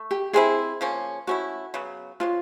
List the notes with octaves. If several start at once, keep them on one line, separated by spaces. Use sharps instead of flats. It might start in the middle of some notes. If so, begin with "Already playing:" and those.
Already playing: A3
G4
G#3 C4 E4 G#4
C#3 F3 A#3 C#4
A3 C#4 E4 F#4
C#3 F#3 B3
F3 G#3 C#4 F4